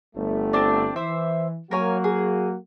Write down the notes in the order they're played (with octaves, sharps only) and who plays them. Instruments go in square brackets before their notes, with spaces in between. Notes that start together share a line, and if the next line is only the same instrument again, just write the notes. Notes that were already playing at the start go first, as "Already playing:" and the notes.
[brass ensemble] G1 A3
[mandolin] C4 D4 D5
[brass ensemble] E3 [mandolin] C5 E5 D6
[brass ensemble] F#3 A#3 F#4 [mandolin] A#4 C#5 G#5
[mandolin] G#4